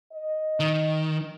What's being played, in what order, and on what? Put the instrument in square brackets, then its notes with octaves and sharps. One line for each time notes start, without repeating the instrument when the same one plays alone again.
[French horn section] D#5
[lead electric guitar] D#3